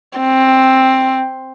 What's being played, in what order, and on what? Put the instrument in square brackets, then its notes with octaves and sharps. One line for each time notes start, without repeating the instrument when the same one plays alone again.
[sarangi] C4